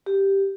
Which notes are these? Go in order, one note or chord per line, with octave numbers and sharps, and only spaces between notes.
G4